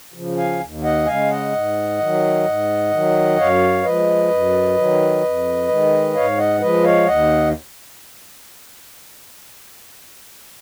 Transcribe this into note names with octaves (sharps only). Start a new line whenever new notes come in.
C#3 F3
F5 G#5
D#2
D#5 F#5
C#3 G#3 F5 G#5
D#5 F#5
G#2
D#3 F#3
G#2
D#3 F#3
F#2 C#5 F5
F3 G#3 B4 D#5
F#2
D#3 F#3
F2
D#3 G#3
G#2 C#5 F5
D#5 F#5
F3 G#3 B4 D#5
C#5 F5
D#2 D#5 F#5